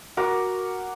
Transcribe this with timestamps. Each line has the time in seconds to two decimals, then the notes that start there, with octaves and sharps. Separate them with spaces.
0.17 F#4 A#4 D6